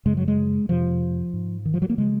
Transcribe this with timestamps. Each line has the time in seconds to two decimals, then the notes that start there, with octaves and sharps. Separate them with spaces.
0.05 F#2 C#3 G#3
0.17 F#3
0.28 G#3
0.69 F2 C3 F3
1.34 G#2
1.65 D#3
1.74 F3
1.82 F#3
1.90 A#3
1.98 C#3 G#3